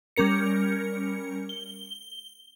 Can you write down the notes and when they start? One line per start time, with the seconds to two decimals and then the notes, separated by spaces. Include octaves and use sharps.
0.16 G3 C#4 A#4 C#7
1.49 G7